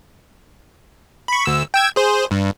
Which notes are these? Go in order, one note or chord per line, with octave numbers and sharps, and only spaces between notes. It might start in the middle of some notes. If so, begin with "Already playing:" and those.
B5 C#6
D2 E6
G5 E6 G#6
G#4 C5
G2